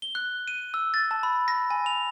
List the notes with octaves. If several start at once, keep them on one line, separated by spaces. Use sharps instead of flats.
G7
F#6
D#7
E6
A6
A5
B5
A#6
G#5
F7